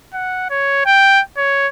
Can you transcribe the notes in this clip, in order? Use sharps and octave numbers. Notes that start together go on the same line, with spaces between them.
F#5
C#5
G5
C#5